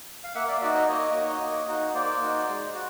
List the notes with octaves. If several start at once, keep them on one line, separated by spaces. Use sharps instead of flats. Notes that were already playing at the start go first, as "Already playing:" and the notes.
F5
A#3 E5 F#5
D5 E5
D#4 F#4 D5 E5
C#5 D#5
A#3 C#5 D#5
D#4 F#4
A#3
D#4 F#4
A#3 C5 D5
D#4 F#4
G#3
F#4